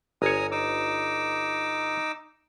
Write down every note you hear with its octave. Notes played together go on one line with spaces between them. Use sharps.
G1 C#5 G#5 A#5 D#6
D#4 D6 E6